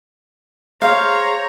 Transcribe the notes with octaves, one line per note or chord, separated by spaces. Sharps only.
G#4 C5 C#5 F5 A#5